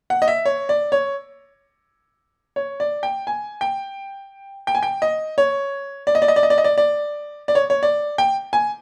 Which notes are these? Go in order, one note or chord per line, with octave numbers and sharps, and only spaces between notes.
F#5
D#5
E5
C#5
D5
C#5
C#5
D5
G5
G#5
G5
G5
G#5
G5
D#5
C#5
D5
D#5
D5
D#5
D5
D#5
D5
D#5
D5
D5
D5
C#5
C#5
D5
G5
G#5